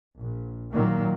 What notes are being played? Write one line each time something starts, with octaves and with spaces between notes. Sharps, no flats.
A#1
A#2 D#3 F#3 A#3